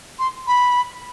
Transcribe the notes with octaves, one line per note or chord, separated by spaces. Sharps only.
C6
B5